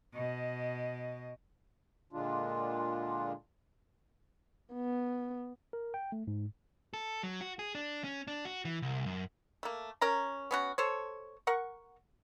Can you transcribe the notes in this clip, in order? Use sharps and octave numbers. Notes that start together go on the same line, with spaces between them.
B2 D#5
A#2 D3 G#3 D4 F4
B3
A#4
G5
A3
G#2
A4
F#3
F#4
G#4
D4
C#4
D4
F#4
E3
C2
F#2
A3 A#3
C#4 A#4 A#5
B3 C#4 F#4
A4 C5 C#5
A#4 F#5 C#6